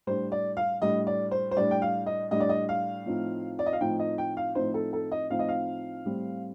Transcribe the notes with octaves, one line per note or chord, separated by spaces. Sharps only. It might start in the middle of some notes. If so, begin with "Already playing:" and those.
A2 G3 D4 C5
D5
F5
A2 G3 D4 D#5
D5
C5
C5
A2 G3 D4 D5
G5
F5
D#5
A2 G3 D4 D#5
D5
D#5
F5
A2 F3 C4 D#4
D5
D#5
F5
A2 F3 C4 D#4 G5
D#5
G5
F5
A2 F3 C4 D#4 C5
A4
A4
D#5
A2 F3 C4 D#4 F5
D#5
F5
A2 G3 C4